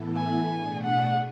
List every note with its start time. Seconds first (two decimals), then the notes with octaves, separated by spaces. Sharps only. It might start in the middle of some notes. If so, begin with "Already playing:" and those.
Already playing: A2 E3 B3 E4 A4
0.16 G#5
0.50 B2 A3 D4 G#4
0.84 F#5